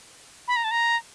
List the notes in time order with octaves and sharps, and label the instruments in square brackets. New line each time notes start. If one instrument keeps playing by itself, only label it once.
[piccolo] B5
A#5
A5
A#5